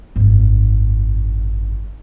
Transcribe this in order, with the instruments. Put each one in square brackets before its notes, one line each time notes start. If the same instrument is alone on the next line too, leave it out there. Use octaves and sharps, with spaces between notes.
[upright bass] G#1 F#2